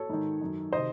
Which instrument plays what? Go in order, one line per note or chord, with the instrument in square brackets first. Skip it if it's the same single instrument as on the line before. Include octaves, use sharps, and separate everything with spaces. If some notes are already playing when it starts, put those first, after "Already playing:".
Already playing: [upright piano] A4 C#5
G#2 D#3
F#2 D#3
C3 D#3 C5 D#5